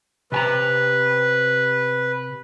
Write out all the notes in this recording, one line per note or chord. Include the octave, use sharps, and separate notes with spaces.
C3 B4 G#5 A#5